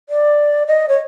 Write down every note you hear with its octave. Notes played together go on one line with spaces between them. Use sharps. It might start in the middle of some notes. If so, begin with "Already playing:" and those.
D5
D#5
C#5